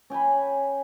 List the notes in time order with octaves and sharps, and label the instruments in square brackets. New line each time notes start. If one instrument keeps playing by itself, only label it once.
[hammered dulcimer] C#4 G5 G#5 B5